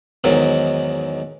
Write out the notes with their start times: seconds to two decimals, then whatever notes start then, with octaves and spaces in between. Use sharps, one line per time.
0.24 E2 G#2 D#3 F#3